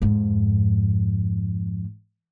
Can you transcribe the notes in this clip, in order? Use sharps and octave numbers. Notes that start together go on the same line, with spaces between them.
F2 G#2